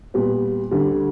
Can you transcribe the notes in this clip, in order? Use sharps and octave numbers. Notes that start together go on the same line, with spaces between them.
A#2 G3 B3
D2 D3 G3